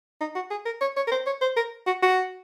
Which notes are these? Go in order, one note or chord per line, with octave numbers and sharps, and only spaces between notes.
D#4
F#4
G#4
A#4
C#5
C#5
A#4
C5
C#5
C5
A#4
F#4
F#4